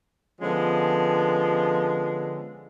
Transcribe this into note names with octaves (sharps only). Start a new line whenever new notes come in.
D3 F3 G#3 B3 C#4